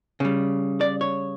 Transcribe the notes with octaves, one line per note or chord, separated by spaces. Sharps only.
C#3 G3
D5
C#5